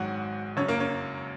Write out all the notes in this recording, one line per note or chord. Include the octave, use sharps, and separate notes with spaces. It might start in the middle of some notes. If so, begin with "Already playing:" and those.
Already playing: G#1 G#2 F#3 F#4 F#5
F#1 F#2 C#3 F#3 C#4 C#5
A#3 A#4
C#4 C#5